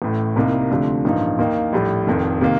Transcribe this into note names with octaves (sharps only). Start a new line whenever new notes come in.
A1 A2 A3
C2 C3 G3 A#3 D#4
D2 C3 F3 A3 D4
A1 G2 F3 A#3 D#4
D#2 D#3 A#3 D#4
A#1 A2 G3
F1 F2 D#3
C3 D#3 A#3